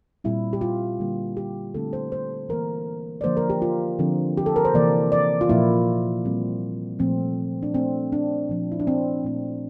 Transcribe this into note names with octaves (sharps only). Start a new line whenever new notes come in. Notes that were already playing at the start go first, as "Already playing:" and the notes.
A#2 G3 C4 E4
G4
F4
D3 G3 A#3
G4
D3 A3 C4 A4
C5
C5
E3 A#3 A#4
D5
D3 F3 A#3 C5
A#4
G4
F4
D3 F3 C4
G4
A4
A#4
C5
C3 E3 A#3 D5
D5
F4
A#2 F3 A#3 E4
A#2 G3 C4
A#2 F3 A3 C4
D4
A#2 A3 C4
D4
A#2 F3 A3
E4
D4
C4
A#2 A3 C4